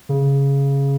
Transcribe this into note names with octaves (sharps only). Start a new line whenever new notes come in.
C#3